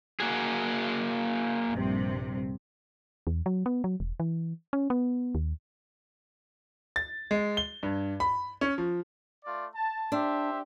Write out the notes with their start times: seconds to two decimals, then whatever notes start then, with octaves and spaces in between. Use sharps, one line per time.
0.20 A#3 F#4 G#4
1.70 A#1 G2 C3
3.27 E2
3.46 F#3
3.66 B3
3.84 F#3
4.00 E1
4.20 E3
4.73 C#4
4.90 B3
5.35 D#2
6.96 A6
7.31 G#3
7.57 G7
7.83 G2
8.20 B5
8.61 C#4
8.78 F3
9.44 A3 F4 D5
9.75 A5
10.12 D4 G4 C5 E5